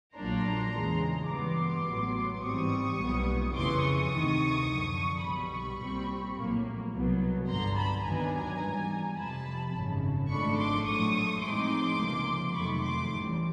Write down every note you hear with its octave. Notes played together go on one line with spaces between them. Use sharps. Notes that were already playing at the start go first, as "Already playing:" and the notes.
A#1 A#2 F#3 A#3 D4 A#5 C6
E2 C#3 E3 G#3
G2 E3 G3 B3 C6 D6
A1 A2 F#3 B3
G#2 E3 G3 C4 C#6 D#6
B1 A#2 G3 B3
F2 C#3 E3 C6 D6
C#6 D#6
D2 C3 D#3
F#2 D3 F3
B1 B2 G3 B5 C#6
C2 A#2 G3 C4
A#1 A2 F#3 A#3
C2 B2 F#3 B3
G1 G2 D3 A#5 C6
A5 B5
D#2 D#3 F#3 B3 D4 G#5 A#5
G#2 E3 G3
F2 C3 F3 A5 B5
G#1 F#2 C#3
G#1 G#2 F3 A3 D4 B5 C#6
C6 D6
A#1 A2 F#3 A3 C#6 D#6
A2 F3 G#3 C4 D#4 C6 D6
C#2 C3 F3 A#3
F2 C3 D#3 F#3 A3 B5 C#6
C6 D6
A1 A2 E3 G3